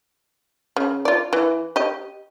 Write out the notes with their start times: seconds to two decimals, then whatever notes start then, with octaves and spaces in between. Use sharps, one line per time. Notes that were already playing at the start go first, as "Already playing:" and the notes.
0.76 C#3
1.05 F4 D5
1.33 E3
1.76 G4 D#5